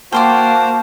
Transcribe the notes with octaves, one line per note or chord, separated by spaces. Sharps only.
A#3 F#4 C5 F5 G5 A5 C6 D6